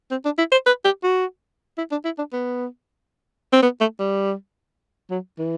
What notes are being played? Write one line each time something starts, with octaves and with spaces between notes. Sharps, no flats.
C4
D4
E4
C5
B4
G4
F#4
E4
D4
E4
D4
B3
C4
B3
A3
G3
F#3
E3